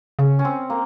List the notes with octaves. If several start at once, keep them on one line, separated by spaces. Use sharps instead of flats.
C#3 C#4
C#4
C4
A#3